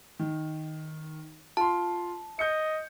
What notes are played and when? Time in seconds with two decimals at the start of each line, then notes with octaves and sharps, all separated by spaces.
0.19 D#3
1.57 F4 A5 C6
2.39 D#5 G6 C#7